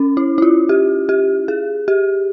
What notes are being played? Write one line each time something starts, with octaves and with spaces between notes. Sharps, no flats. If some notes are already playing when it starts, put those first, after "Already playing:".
Already playing: C#4
E4
E4
F4
G4
G4
G#4
G4